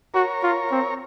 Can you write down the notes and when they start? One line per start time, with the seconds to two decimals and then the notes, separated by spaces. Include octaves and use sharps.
0.14 F#4 A#4 C#5
0.43 F4
0.72 C4